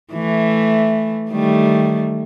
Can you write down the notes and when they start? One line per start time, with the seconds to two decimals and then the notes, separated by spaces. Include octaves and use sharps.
0.13 E3 A3
1.30 D#3 G3 A3